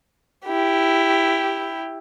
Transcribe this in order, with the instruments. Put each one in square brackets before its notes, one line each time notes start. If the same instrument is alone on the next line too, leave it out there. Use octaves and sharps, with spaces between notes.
[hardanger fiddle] E4 G4